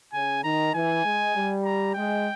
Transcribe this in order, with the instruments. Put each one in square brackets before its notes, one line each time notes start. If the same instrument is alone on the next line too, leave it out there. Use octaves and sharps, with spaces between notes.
[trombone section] C#3 [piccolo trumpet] G#5
[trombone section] D#3 [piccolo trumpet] A#5
[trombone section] E3 [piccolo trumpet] G#5
[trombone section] G#3
G3
[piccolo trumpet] A#5
[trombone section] G#3 [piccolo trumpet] G5